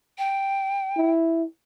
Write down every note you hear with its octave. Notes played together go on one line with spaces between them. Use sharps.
G5
E4